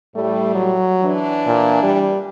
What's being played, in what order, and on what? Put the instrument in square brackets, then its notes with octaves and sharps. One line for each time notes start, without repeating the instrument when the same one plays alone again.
[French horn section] A2 G3 [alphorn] A3
[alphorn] F#3
[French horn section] E3 D4
[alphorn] A#2
G3